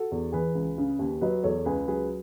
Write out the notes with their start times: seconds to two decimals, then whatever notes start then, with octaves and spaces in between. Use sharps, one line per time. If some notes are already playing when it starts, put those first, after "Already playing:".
Already playing: F#4 A4
0.11 E2
0.32 E3 G#4 B4
0.55 C#2
0.78 C#3
0.99 D#2
1.21 F#3 B4 D#5
1.43 E2 A4 C#5
1.65 C#2 G#4 B4
1.87 F#3 G#4 B4